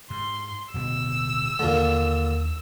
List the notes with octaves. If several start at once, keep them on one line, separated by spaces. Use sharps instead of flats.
G#2 C6
D1 B2 B3 E6
D#2 A#2 D3 A3